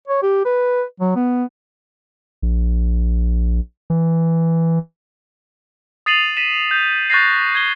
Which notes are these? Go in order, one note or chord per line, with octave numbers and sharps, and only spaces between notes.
C#5
G4
B4
F#3
B3
A#1
E3
D#6 A6 C7 D#7 F7 F#7
B6 D#7 E7
G6
C#6 F#6 G6 A6 A#6 C7
G#6 G7